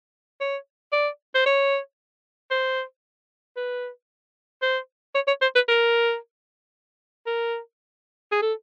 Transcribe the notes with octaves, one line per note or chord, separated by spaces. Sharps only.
C#5
D5
C5
C#5
C5
B4
C5
C#5
C#5
C5
B4
A#4
A#4
G#4
A4